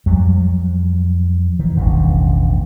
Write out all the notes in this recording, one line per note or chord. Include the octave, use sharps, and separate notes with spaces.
F2 F#3 G3
D#3 E3
E1 A1 G2 D#3